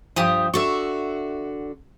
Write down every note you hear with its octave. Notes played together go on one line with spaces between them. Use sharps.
G2 F3 G4 D#6
D3 F#4 E5 C#6